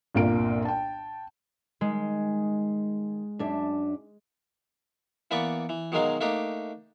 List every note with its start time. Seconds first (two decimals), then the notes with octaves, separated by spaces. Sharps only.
0.15 G1 C2 A#2 A#3 F4 D7
0.65 G5 A5
1.81 D#3 G#3
3.39 F#2 D4 E5
5.31 E3 A#3 B3 B4 D5 C#6
5.69 E3
5.92 B2 D#3 F#3 G#3 A#4 F5
6.21 A3 A#3 D4 D#4 G4